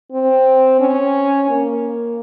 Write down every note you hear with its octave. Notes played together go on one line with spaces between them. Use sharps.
C4
C#4
A#3